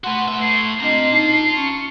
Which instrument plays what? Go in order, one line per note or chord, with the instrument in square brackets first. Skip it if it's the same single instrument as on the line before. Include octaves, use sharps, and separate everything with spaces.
[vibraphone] A3 C6 [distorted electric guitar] F#4 B4 [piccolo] F#5
[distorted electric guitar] A2 E5
[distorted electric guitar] A2 [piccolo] C7
[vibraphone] C4 D4 D#5 [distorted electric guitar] F4 A#5
[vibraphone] D#4 A5
[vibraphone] C#4 [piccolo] C#7